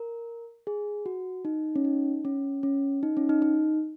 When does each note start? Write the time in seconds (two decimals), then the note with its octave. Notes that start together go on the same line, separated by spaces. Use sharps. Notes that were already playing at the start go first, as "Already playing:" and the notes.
Already playing: A#4
0.67 G#4
1.06 F#4
1.45 D#4
1.76 C#4
1.85 D#4
2.25 C#4
2.63 C#4
3.03 D#4
3.17 C#4
3.29 D#4
3.42 D#4